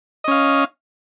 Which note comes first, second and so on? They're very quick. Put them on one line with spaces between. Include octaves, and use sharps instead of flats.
D#5 C#4 F5